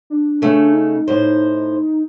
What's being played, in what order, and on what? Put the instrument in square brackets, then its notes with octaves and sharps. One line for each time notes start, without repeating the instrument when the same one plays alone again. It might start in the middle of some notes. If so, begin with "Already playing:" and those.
[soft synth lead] D4
[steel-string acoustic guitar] C#3 A3
[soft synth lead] D#4
[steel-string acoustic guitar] A2 C5